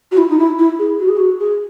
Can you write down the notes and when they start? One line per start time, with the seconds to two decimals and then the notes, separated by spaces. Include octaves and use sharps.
0.12 F#4
0.18 E4
0.30 D#4
0.39 E4
0.59 E4
0.79 G#4
0.99 F#4
1.09 G#4
1.17 F#4
1.40 G#4